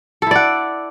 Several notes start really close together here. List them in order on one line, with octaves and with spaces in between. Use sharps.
A4 E4 D5 F#5